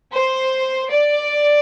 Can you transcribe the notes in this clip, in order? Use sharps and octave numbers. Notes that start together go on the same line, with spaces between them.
C5
D5